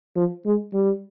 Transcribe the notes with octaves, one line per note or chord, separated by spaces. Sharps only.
F3
G#3
G3